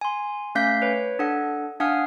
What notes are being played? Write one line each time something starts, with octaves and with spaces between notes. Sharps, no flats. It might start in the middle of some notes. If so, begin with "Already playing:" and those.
G#5 C6
A3 C#4 F5 G6 B6
B4 C#5
D4 A4 F#5
D4 F5 F#5 G#5 D#6 F6